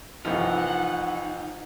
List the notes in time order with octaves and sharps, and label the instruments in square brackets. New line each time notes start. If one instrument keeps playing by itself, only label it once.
[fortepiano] C2 E3 F3 [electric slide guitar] D#4 [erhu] F#5